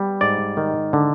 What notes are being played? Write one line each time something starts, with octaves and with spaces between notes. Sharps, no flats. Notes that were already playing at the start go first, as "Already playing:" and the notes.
Already playing: G3 B3
G#2 D5
D#3
D3